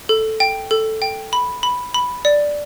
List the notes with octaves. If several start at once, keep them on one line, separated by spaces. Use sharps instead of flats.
A4
G5
A4
G5
B5
B5
B5
D5